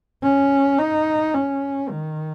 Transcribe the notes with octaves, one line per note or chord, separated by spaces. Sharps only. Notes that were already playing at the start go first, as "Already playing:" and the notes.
C#4
D#4
C#4
D#3